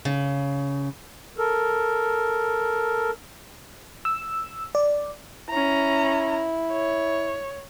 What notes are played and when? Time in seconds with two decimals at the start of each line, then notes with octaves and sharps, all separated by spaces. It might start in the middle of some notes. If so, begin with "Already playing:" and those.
0.05 C#3
1.38 A4 A#4
4.05 E6
4.75 D5
5.50 C#4 E4 A#5
6.72 C#5